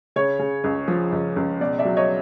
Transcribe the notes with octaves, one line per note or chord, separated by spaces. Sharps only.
C#3 C#5
C#3
C#2
F3
C#2
C#2
B2 D5
D5 E5
F#3
C#5 D#5